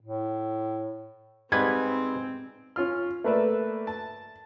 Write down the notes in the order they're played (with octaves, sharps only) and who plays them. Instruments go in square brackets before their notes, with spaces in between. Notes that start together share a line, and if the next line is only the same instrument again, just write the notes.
[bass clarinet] A2
[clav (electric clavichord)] G#2 G3 B4 [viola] C4 [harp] G#6
[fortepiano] C#4 F4 F6
A3 A#3 B4 D5 E5
A5